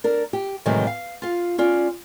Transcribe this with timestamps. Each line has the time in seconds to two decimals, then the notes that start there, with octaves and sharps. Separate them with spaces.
0.04 D4 A#4
0.33 G4
0.66 A2 C3 D#3 E3 F#3 G#3
0.87 F5
1.22 F4 F5
1.58 C#4 F4 D5